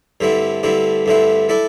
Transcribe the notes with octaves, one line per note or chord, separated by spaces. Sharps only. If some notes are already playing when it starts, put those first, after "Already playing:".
G2 D3 A3 C4 E4
G2 D3 A3 C4 E4
G2 D3 A3 C4 E4
A3 E4 A4 D5